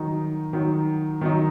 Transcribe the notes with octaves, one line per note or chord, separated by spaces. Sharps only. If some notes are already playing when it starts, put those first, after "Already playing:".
Already playing: D#3 F#3 D#4
D#3 F#3 D#4
D#3 F#3 D#4